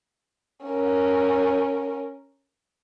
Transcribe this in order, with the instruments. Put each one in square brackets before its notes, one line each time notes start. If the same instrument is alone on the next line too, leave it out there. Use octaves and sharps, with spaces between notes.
[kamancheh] C#4 A#4